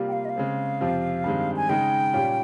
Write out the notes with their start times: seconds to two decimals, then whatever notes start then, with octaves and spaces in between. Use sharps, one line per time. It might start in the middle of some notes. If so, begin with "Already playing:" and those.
Already playing: C3 G3 A#3 F4
0.08 G5
0.13 F5
0.25 D#5
0.30 F5
0.36 C#3 G#3 C4
0.80 F2 C3 F3 C4 F4
1.24 G2 D#3 G#3 C4
1.56 G#5
1.69 C#3 G#3 D#4 G5
2.14 A#2 G3 C#4 F4